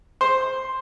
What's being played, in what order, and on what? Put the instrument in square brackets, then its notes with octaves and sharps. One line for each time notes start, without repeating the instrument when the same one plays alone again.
[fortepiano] C5